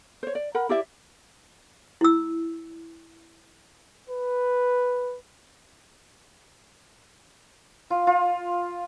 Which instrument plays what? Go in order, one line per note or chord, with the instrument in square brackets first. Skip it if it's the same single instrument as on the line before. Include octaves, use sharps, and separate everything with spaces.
[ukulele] C5 C#5
D5
A#4 F#5 B5
E4 G4 D5 E5
[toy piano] E4 E6
[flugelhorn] B4
[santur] F4
F4